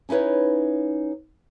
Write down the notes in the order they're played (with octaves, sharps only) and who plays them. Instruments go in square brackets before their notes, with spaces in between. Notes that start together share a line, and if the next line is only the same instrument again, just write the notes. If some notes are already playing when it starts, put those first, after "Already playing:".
[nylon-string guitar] C#4 D#4 E4 B4 C#5